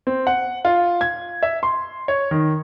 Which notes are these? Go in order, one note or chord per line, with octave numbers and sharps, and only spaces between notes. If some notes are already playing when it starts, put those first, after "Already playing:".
C4
F#5
F4
G#6
E5
C6
C#5
D#3